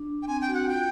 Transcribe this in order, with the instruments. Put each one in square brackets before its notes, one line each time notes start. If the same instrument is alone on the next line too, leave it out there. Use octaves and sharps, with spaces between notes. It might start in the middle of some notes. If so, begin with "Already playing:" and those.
Already playing: [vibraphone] D4
[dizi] G5
[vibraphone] C4 [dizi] G#5
[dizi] G5
[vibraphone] F#4
[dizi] F#5
[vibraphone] F4 [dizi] G5